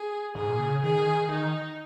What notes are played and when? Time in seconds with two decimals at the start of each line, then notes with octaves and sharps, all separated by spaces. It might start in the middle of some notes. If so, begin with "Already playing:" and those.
Already playing: G#4
0.35 G#2 G#4
0.48 A#2
0.59 C#3
0.83 D#3 G#4
1.06 D#3
1.30 D#3 D#4